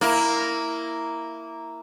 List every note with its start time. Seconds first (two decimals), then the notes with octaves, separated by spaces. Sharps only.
0.01 A#3 E4